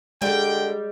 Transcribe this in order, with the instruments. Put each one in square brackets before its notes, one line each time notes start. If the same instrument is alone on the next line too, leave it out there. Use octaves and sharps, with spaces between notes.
[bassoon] D3 [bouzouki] G3 [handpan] G#3 [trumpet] G5